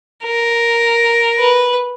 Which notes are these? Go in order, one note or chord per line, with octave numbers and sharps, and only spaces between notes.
A#4
B4